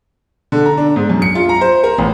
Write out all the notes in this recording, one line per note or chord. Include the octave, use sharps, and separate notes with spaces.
D3
A#5
D4
G#2
F#2
C#7
F4
A#5
C5
A#4
A1